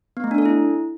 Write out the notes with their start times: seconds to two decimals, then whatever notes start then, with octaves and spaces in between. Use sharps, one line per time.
0.17 B3
0.24 A3
0.31 D4
0.38 A4
0.45 E4